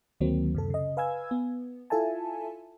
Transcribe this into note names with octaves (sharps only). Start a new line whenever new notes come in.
D2 D#3 F#3 A#3 C4
F#2 C3 A4
C#3 D#5
B4 F5 G#5 E6 G#6
B3
E4 F4 A4 E5 G#5 A5